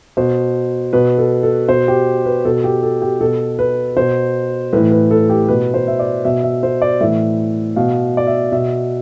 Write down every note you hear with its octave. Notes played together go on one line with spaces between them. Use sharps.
B2 C5
B2 B4
A4
A4
B2 C5
G4
B4
B2 A4
G4
A4
G4
B2 A4
B4
B2 C5
A2 E3 B4
B4
A4
G4
B2 B4
C5
E5
D5
B2 E5
E5
C5
D5
A2 E3 E5
B2 F5
D5
E5
B2 E5